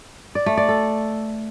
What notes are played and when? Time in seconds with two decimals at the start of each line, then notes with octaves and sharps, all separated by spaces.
0.35 D5
0.46 A3
0.57 D5
0.69 A4